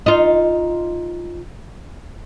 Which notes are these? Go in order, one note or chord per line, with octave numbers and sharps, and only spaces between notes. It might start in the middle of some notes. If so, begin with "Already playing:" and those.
D#4 F4